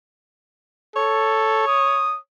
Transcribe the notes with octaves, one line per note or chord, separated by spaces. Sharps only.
A4 C#5
D#6